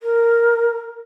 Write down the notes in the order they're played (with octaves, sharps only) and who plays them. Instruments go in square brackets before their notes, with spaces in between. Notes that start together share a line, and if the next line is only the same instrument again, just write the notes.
[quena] A#4